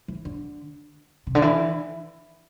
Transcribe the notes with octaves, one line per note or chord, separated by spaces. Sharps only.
E3
D3
C3
D3
E3